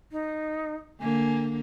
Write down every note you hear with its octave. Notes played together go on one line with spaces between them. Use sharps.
D#4
D3 A#3 G#5